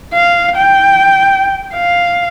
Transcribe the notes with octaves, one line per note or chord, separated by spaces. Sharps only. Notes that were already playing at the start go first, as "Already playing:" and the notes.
F5
G5
F5